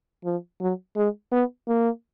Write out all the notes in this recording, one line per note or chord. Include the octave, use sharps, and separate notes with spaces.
F3
F#3
G#3
B3
A#3